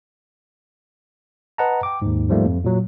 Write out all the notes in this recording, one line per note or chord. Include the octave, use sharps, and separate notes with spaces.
B4 D#5 F#5 A5 A#5
G5 D6
D#2 G#2
G#2 F3 G3 A3 A#3
F2
A#2 F#3